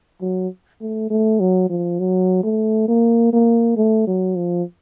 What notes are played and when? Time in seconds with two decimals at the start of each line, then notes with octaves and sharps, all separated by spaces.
0.21 F#3
0.81 A3
1.10 A3
1.40 F#3
1.70 F3
1.99 F#3
2.43 A3
2.88 A#3
3.33 A#3
3.77 A3
4.07 F#3
4.36 F3